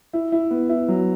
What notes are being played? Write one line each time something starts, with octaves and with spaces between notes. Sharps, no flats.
E4
E4
B3
E4
F#3